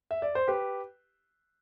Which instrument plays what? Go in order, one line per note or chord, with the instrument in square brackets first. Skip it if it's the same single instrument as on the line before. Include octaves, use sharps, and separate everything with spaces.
[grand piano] E5
D5
C5
G4 B4